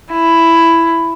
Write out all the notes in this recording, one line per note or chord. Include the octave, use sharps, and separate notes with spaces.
E4